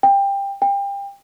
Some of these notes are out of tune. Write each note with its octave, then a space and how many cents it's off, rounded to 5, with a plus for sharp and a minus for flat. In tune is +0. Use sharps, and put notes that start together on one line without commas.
G5 +20
G5 +30